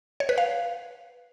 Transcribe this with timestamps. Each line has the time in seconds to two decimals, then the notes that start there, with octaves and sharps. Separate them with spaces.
0.20 C#5
0.29 B4
0.38 F5